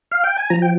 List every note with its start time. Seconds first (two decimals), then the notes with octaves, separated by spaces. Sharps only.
0.12 F5
0.24 G5
0.38 G#5
0.50 F3 A#5
0.62 G5